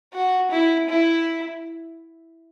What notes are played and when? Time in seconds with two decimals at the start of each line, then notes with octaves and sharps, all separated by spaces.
0.13 F#4
0.51 E4
0.89 E4